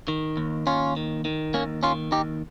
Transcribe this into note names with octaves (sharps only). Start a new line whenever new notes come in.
D#3
D#2
D#2 C#4 F4
D#3
D#3
D#2 A#3 C#4
D#3 C#4 F4
D#2 D#4 G4